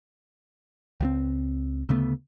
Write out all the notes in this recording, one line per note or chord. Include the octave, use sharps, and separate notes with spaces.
C#2 F3 C4
D2 C#3 A3 B3